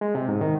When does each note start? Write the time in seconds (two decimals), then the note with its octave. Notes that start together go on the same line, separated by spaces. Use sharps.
0.01 G#3
0.15 C3
0.28 G#2
0.41 D#3